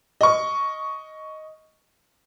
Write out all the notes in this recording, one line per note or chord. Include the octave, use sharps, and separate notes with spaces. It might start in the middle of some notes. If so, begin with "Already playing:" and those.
D#5 C#6